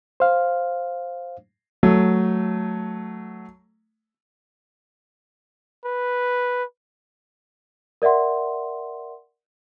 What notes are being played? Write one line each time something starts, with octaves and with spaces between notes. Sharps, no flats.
C5 F5
F#3 A3
B4
A#4 D5 E5 F#5 C6